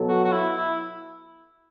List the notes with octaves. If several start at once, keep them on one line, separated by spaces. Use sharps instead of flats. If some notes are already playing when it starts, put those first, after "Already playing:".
Already playing: B2 F#3 B3 A4
F#4
F#4
E4
E4